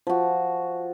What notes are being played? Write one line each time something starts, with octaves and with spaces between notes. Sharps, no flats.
F3 F#4